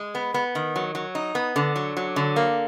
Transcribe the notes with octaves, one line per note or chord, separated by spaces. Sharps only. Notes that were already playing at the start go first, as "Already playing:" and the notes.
Already playing: G#3
B3
B3
D#3
F#3
F#3
D#4
B3
D3
F#3
F#3
D3
A#3